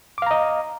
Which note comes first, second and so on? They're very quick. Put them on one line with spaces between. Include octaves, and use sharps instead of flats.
D6 F5 A#5 D#5